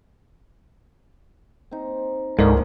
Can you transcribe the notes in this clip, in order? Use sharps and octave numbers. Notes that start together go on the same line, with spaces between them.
C4 D#4
C#2 G#2 F3 A#3 D4 A4 A#4 D5